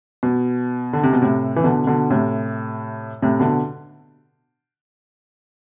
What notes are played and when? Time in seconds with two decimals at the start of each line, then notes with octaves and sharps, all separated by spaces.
0.23 B2
0.93 D3
1.03 C3
1.13 B2
1.22 A2 C3
1.56 E3
1.64 B2 D3
1.87 B2 D3
2.10 A2 C3
3.22 A2 C3
3.40 B2 D3